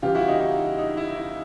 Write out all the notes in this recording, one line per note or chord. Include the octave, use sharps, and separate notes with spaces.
C#3 E3 G3 F4 G4
E4 F#4
D#4 F4
D#4
D#4
E4
E4